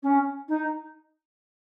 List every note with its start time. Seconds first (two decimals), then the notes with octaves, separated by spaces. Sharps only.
0.03 C#4
0.48 D#4